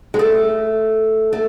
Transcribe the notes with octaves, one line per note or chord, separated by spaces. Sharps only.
G#3
A3
A3